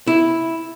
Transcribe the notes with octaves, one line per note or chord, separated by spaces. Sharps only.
E4